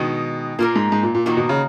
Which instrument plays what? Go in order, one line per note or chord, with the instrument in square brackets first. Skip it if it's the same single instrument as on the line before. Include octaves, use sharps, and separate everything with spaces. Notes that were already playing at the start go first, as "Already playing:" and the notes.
Already playing: [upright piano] B2 [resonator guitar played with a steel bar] D#3 G#3 D#4
[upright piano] A#2 [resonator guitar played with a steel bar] A#3 F4 A#4
[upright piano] G#2
G#2
A#2
A#2
[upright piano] A#2 [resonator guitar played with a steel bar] D#3 A#3 D#4 F#4 A#4
[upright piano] B2
C#3